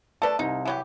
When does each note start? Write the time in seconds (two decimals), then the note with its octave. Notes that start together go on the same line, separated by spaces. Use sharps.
0.22 A3 A4 B4 D5 A5
0.39 C2 D#4
0.65 E3 F#3 G4